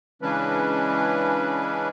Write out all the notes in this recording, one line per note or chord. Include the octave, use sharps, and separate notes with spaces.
C#3 E3 G#3 C#4 D4 B4